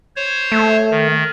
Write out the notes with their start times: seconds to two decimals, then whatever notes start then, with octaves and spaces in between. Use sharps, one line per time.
0.16 C5 C#5
0.52 A3
0.91 D#3